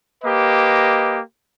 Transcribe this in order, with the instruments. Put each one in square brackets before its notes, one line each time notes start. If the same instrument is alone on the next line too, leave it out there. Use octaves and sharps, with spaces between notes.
[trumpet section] A#3 G4 B4 D#5